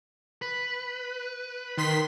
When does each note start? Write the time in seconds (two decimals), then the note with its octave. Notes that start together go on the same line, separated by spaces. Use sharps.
0.42 B4
1.77 D#3 C6 B6